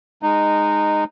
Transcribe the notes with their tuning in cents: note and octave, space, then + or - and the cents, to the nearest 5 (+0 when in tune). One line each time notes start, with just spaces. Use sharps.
G#3 -10 D#4 -15